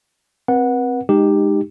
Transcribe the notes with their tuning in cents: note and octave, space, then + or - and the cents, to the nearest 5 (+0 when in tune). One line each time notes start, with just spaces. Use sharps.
C4 +0 B4 -35 F#5 -10
G#3 +0 D#4 -15 G4 +5